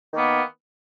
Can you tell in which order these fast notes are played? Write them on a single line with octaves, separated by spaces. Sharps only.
D#3 A#3 B3